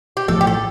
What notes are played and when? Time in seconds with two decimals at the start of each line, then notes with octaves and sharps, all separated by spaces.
0.17 G4
0.28 A1 A2 F3 A4
0.41 G4
0.47 A4